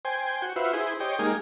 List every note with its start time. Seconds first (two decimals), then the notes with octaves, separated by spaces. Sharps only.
0.05 C5 G5 G#5
0.42 F#4
0.56 F4 F#4 B4 C5 E5
0.73 E4 G#4 C5
1.00 G4 C5 C#5 D#5 G5
1.19 G#3 A#3 D#4 G4 G#4